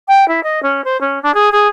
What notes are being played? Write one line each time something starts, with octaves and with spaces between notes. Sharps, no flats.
G5
E4
D#5
C#4
C5
C#4
D4
G#4
G#4